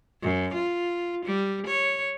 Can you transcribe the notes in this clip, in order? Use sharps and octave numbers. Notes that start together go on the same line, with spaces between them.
F#2
F4
G3
C#5